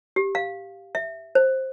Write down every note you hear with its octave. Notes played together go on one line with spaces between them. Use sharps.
G4
F5
E5
C5